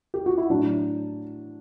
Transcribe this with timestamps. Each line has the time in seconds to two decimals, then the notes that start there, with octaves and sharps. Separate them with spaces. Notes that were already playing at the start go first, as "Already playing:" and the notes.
0.14 G4
0.26 F#4
0.38 E4
0.50 A2 F#3 D4